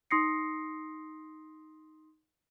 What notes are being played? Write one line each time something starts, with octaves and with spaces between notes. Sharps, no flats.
D#4 C6 D#6 A#6 C7 C#7